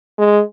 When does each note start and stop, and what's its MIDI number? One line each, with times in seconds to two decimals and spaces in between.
0.18 0.41 56